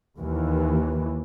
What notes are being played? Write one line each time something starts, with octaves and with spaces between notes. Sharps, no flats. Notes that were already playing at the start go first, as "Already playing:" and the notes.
D#2 E3